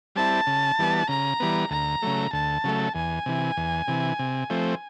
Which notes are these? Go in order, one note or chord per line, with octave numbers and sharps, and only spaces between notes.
G3 C4 E4 A5
C#3
E3 G3 B3
C#3 A#5
E3 G3 B3
D2 A#5
C#3 F#3 A3
D2 A5
C#3 F#3 A3
E2 G#5
C3 E3
E2
C3 E3
C3
F3 A3 C4